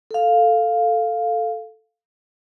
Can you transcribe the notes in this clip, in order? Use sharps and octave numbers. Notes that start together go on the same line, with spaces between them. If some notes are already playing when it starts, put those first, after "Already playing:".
A4 F5